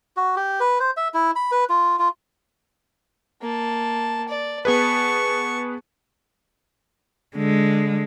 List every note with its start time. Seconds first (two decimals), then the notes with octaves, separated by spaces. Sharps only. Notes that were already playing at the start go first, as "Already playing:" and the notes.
0.17 F#4
0.36 G4
0.60 B4
0.80 C5
0.97 E5
1.14 E4
1.36 B5
1.52 B4
1.69 F4
1.99 F4
3.42 A#3 A5
4.28 D5
4.65 B3 G#4 B4 A5 C#6
7.36 D3 G#3